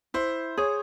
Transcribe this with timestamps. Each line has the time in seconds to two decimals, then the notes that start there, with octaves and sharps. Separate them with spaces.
0.14 E4 C5
0.57 G#4 C#5